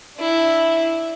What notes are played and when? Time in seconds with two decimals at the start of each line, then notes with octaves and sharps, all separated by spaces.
0.17 D4 E4